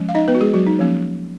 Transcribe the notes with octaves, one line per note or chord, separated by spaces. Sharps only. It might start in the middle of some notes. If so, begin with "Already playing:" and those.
Already playing: F3 G#3 C#4
F5
D#4 D#5
B3 B4
F#4
G#3 G#4
F#3 F#4
D#4
F3 A#3 C#4